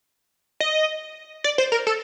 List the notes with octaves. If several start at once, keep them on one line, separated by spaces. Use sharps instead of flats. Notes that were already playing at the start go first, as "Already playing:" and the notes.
D#5
D5
C5
A#4
A4